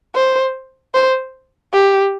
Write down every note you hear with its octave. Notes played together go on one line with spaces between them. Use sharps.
C5
C5
G4